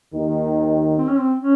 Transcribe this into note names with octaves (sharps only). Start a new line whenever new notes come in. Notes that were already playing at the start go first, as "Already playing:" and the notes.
D#2 D#3
C4
C#4
C4
C#4